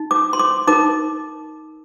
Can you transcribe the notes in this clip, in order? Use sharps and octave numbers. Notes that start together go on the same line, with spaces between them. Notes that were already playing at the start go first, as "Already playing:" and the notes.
Already playing: D#4
D6
C6
D6
D#4 A#4 D6